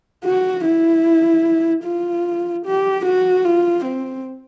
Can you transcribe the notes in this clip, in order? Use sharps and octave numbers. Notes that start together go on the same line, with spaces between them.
F#4
E4
F4
G4
F#4
F4
C4